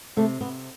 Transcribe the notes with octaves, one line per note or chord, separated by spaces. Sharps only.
C3 A3
C3 B3